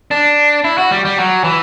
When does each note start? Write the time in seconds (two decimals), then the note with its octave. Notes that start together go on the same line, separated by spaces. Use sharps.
0.11 D4
0.64 E4
0.78 F#4
0.91 G3
1.05 G3
1.18 F#3
1.44 E3